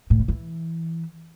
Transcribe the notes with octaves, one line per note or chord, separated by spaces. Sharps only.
A2
C#3
E3